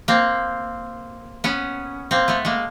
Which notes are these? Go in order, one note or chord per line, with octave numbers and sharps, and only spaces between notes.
A#3 C4
B3 C#4
A#3 C4
A3 B3
G#3 A#3